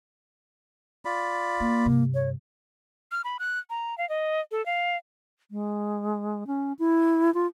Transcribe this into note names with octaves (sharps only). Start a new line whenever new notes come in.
F4 D5 B5
A#3 E4
G2 C3
C#5
F6
B5
F#6
A#5
F5
D#5
A4
F5
G#3
C#4
E4
F4